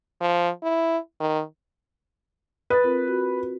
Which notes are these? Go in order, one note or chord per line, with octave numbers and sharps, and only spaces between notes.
F3
E4
D#3
B4 D#6 A6
C4 F4 A#4
F#4